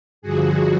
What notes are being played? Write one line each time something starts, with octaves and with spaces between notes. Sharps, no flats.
G2 D3 F3 F#4 G#4